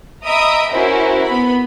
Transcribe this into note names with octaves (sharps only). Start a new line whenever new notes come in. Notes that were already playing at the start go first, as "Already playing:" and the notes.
D#5 E5 A#5 B5 D#6 D7
C#4 E4 F#4 A#4 C5
B3 B5